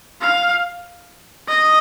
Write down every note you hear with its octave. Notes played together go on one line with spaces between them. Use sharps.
F5
D#5